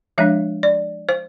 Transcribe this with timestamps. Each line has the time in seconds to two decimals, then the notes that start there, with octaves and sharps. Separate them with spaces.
0.18 F3 G#3 D4 E5
0.63 D5
1.09 C5